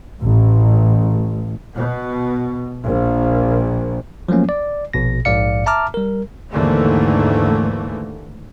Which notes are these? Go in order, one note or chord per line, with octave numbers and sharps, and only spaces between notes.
A1
B2
A#1
F3 F#3 A3 A#3 C#4
D5
A#1 B2 A#6
A#1 G#2 D5 F5 C#7
E5 A5 A#5 D6 F6
G3 A#4
D#2 G#2 D3 E3 A3 A#3